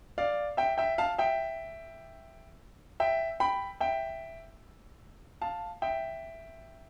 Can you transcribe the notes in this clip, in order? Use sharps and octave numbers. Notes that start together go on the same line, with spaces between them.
D5 F5
E5 G5
E5 G5
F5 A5
E5 G5
E5 G5
G5 B5
E5 G5
F5 A5
E5 G5